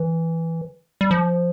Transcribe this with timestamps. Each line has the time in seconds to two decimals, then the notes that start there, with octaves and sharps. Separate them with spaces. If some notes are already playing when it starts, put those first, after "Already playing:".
Already playing: E3
1.01 G3
1.11 F3